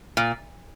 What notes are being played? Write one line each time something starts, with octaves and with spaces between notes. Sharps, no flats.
A#2